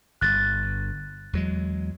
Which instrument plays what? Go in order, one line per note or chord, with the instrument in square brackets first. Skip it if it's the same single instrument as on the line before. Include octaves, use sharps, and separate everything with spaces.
[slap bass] G1 [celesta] F#6 A6
[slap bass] E2 F#3 G#3